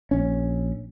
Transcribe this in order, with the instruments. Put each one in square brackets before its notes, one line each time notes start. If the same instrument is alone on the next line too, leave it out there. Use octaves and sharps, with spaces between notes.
[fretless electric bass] A#1 C#4